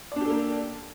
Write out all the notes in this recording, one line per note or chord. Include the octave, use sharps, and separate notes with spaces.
A#3 D4 G4 A4 D5